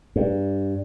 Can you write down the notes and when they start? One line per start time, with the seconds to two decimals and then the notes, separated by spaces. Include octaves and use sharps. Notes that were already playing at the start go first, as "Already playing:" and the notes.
0.16 G2